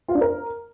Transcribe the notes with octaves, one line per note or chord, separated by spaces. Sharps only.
F4
D4
A#4